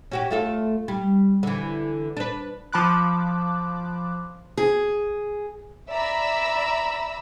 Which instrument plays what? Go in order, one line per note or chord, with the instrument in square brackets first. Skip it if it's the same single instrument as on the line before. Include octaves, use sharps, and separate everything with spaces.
[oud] C#4 F#4 G4
A3 F4 A4
G3
D3 E3
D4 B4
[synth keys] F3 A5 B5 D6 F#6
[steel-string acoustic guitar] G#4
[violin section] D5 E5 A#5 B5 E6